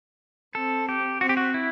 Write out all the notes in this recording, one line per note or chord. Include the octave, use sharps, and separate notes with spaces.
C4 A4
G4
C4 F#4
G4
F#4
E4